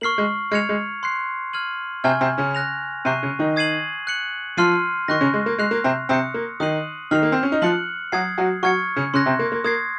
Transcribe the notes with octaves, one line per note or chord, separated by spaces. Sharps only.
A#3 C#6 F6 C7 F#7
G#3
G#3 F6 G#6 C#7 F7
G#3
C6 F#6 C7
F6 G#6 D#7 F#7
C3 C4 G#5 C#6 F6 G#6
C3 C4
C#3 C#4
F#6 A#6 F7
C3 C4 C#6 F#6 C7 D#7
C#3 C#4
D#3 D#4
D#6 G#6 C7 D#7 F#7
F#6 C#7 F#7
F3 F4 C6 F6 C7 D#7
D#3 D#4 C#6 F#6 A#6
C#3 C#4
G#3
A#3
G#3 C6 F#6 C7 F7
A#3
C3 C4
C3 C4 D#6 F#6 C#7
A#3
D#3 D#4 D#6 F#6 C7 D#7 F#7
D#3 D#4 F6 C7 F7
A#3
C4
C#4
D#4
F3 F4 F#6 C#7 F#7
F#3 F#4 D#6 G#6 C7
F#3 F#4
F#3 F#4 C#6 F6 G#6 C#7
C#3 C#4
C#3 C#4 C6 F#6 A#6
C3 C4
A#3
A#3
A#3 D#6 G#6 C7